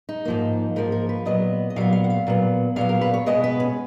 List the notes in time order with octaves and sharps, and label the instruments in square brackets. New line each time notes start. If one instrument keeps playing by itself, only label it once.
[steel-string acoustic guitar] D#4
G#2 F3 A#3
G#2 F3 A#3 A#4
A#4
B4
A#2 F#3 B3 D#5
D#5
A#2 F#3 B3 F5
F5
F#5
F5
A#2 F#3 B3
A#2 F#3 B3 F5
A#4
B4
C#5
B2 G#3 B3 D#5
B4
C#4